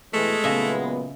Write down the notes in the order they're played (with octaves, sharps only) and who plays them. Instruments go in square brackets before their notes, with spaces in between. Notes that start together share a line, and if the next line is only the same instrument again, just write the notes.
[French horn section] B2 E3 [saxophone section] G#3 [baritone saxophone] A3
[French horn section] A#2 F#3 B3 [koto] C#3 D#5 E5